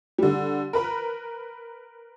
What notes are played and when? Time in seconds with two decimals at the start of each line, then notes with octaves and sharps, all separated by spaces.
0.18 D3 G3
0.73 A#4 B4 A#5 B5